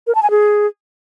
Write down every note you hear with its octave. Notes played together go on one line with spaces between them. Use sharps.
A#4
A5
G#5
G#4